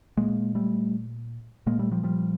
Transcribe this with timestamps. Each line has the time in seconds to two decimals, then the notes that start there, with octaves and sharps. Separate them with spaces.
0.17 A#2 G#3 A#3
0.55 G3 A3
1.67 A#2 G#3 A#3
1.79 G3 A3
1.91 F3 G3
2.03 F3 G3